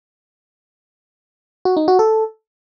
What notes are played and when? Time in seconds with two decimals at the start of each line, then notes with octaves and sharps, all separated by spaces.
1.65 F#4
1.77 D#4
1.88 F#4
1.99 A4